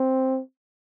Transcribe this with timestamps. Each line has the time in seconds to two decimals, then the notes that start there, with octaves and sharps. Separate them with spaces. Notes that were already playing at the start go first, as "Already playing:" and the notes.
Already playing: C4